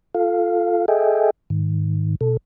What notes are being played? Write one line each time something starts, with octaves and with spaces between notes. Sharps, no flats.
F4 A4 F5
G#4 A4 D#5 E5 G5 G#5
G#2 D#3
B2 A4